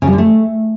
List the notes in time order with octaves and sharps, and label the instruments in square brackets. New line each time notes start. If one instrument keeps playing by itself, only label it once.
[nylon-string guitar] C#3
G3
D3
A3